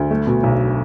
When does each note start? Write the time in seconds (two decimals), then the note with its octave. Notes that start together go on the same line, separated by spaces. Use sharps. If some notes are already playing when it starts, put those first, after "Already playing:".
Already playing: D2
0.11 A3
0.27 B2
0.43 B1